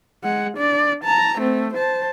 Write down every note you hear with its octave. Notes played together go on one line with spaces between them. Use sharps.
G#3 F#5
D4 D5
A5 A#5
A3 C4
C5 A5